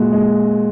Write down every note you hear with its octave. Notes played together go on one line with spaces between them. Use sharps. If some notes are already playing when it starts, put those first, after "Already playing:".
Already playing: A#2 G#3 F#4
G#3